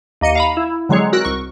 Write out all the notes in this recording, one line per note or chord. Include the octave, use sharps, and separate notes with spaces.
D#2 A#3 D#5 C#7 D#7
F5 A#5 B5
E4
D3 F#3 G#3 C4 G#4 C#5
F#4 A#4 E6 F#6
C2 C#6